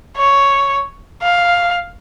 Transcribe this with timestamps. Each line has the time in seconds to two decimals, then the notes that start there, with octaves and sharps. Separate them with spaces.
0.16 C#5
1.22 F5